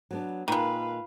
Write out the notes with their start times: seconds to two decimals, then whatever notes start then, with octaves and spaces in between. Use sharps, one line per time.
0.11 F#3 B3 D4
0.48 A#2 D#3 G#3 B4 F5